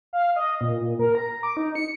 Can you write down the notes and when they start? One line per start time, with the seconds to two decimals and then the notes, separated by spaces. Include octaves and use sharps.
0.13 F5
0.36 D#5
0.61 A#2
0.80 A#2
0.99 A#4
1.15 A#5
1.43 D6
1.57 D#4
1.75 C#7